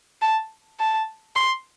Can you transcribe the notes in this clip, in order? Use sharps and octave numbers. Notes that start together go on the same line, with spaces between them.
A5
A5
C6